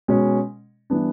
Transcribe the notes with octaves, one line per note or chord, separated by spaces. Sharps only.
B2 G#3 C#4
E3 G3 B3 D4